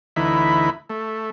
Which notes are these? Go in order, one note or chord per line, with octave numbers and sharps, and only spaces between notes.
D2 E3 D#4 E4 B5
A3